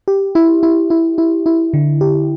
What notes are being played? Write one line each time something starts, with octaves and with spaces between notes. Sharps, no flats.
G4
E4
E4
E4
E4
E4
D3
G4